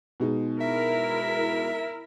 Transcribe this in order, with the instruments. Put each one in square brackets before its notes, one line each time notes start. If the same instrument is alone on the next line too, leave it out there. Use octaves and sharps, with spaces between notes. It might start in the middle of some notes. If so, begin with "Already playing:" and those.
[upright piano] B2 G#3 D#4
[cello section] E4 A#4 [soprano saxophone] E5